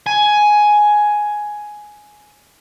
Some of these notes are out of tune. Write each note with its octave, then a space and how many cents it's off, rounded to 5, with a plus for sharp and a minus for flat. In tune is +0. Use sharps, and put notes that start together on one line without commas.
G#5 +10